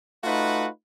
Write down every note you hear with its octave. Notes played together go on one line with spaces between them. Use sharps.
A3 D#4 F4 F#4 B4